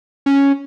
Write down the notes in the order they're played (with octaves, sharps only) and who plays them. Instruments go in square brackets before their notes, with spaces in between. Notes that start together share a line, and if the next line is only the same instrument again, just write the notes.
[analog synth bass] C#4